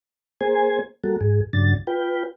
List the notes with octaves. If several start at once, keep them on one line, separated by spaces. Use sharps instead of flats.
A#3 G#4 C5 G#5
G3 A#3 F#4 A4
G#2 G#4
G2 C#3 F#3 D4 A6
F4 B4 G5